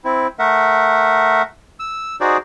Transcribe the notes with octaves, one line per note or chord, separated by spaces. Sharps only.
C4 E4
A3 A#4 E5 F#5
E6
D#4 F#4 G#4 C5 D5